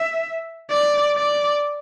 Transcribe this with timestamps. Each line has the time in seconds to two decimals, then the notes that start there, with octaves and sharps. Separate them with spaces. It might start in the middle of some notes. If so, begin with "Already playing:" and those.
Already playing: E5
0.70 D5
1.16 D5